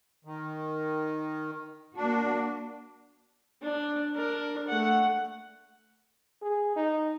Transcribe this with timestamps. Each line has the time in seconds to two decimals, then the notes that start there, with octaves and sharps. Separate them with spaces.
0.25 D#3
1.96 A#3 D4 F#4
3.62 D4
4.15 D4 A#4
4.67 A3 F#5
6.42 G#4
6.76 D#4